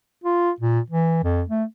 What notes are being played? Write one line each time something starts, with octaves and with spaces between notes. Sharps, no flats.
F4
A#2
E3
F2
A3